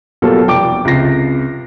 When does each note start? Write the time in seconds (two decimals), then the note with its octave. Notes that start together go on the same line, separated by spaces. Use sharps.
0.22 B2 F#3 G3 A#3 F4 A4
0.48 F1 G5 D6
0.85 C#2 C3 A#6 C7